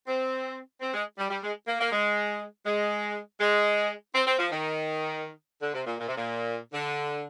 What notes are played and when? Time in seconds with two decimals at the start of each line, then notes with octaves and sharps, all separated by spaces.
0.07 C4
0.81 C4
0.94 G#3
1.18 G3
1.30 G3
1.43 G#3
1.68 A#3
1.80 A#3
1.92 G#3
2.66 G#3
3.40 G#3
4.15 C4
4.27 C4
4.39 F3
4.52 D#3
5.62 D3
5.74 C3
5.87 A#2
6.00 A#2
6.08 C3
6.17 A#2
6.73 D3